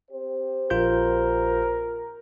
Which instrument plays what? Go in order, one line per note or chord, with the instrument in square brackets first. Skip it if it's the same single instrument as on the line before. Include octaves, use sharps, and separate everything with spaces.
[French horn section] C4 G4 C5
[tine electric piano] A#1 F4 G6 [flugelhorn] A#4